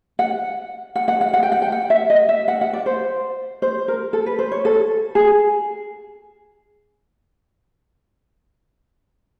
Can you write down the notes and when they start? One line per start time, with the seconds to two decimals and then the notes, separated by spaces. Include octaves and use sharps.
0.19 F#5
0.96 F#5
1.08 F#5
1.21 F#5
1.34 F#5
1.43 G5
1.52 F#5
1.62 G5
1.72 F#5
1.90 E5
2.10 D#5
2.29 E5
2.48 F#5
2.61 F#5
2.73 D5
2.86 C5
3.62 C5
3.88 A#4
4.13 A4
4.26 B4
4.39 C5
4.52 C#5
4.65 A4
5.15 G#4